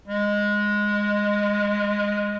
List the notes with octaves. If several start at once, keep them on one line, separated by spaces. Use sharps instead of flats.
G#3